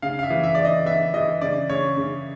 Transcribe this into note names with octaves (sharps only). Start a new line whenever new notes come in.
C#3 F5
F5
E5
E3
E5
E3 D5
D#5
B3 E5
E3 D#5
C#3 D5
C#3 C#5
C#3